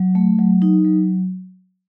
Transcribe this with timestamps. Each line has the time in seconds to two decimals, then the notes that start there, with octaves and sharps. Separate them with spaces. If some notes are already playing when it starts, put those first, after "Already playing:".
Already playing: F#3
0.15 A3
0.39 F#3
0.62 D#4
0.85 F#3